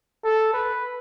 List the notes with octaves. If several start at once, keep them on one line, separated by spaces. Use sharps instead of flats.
A4
B4